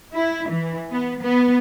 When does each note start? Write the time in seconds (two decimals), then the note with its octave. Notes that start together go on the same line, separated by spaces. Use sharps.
0.15 E4
0.49 E3
0.91 B3
1.21 B3